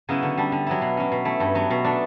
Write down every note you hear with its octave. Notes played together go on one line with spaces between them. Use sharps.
C#3 F#3 B3 E4
D3
G3 D4
D3
F#3 B3 E4
B2
F#3 C#4
B2
A3 E4
G2
F#3 B3
B2
A3 D4